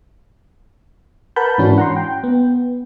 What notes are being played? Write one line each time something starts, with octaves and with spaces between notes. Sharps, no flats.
A#4 B4 F#5 A5 B5 G6
G#2 E3 C#4 D4 F#4
F#5 A#5 C6
G5
B3